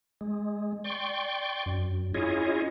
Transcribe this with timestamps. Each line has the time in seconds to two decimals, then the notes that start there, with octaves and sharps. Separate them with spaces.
0.21 G#3
0.84 D5 G5 C6 C#6
1.66 F#2
2.14 C#4 E4 F4 G#4 C#5 D#5